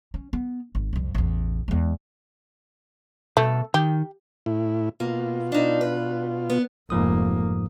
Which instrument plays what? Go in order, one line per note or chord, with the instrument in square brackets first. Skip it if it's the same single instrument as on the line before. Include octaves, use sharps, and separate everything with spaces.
[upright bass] C#4
B3
G#1
C2 F2
A1 E2
E2 G#3
[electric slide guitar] B2 A4 [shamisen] A3
[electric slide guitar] D#3 [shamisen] G4
[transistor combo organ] A2 E4
[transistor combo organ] B2 F4 [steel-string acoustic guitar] A#3
[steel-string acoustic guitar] D4 D#4
B4
B3
[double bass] F1 A#3 [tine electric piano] G#2 F3 D#6